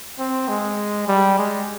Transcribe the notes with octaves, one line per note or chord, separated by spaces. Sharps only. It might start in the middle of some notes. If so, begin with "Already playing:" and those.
C4
G#3
G3
G#3